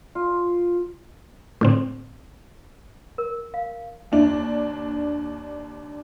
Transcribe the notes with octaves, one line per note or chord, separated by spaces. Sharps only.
F4
A2 D3 C4
A#4
F5
D#2 D4